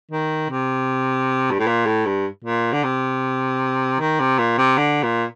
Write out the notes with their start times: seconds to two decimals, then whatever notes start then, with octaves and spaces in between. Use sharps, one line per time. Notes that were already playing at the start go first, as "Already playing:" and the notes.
0.12 D#3
0.50 C3
1.51 G2
1.59 A2
1.67 A#2
1.86 A2
2.06 G2
2.45 A#2
2.73 D3
2.84 C3
4.00 D#3
4.20 C3
4.39 A#2
4.58 C3
4.78 D3
5.03 A#2